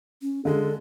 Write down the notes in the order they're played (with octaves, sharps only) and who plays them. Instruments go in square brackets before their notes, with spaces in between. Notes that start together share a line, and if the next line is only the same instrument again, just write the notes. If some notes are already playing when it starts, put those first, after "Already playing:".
[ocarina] C#4
[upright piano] D3 G#3 [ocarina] A4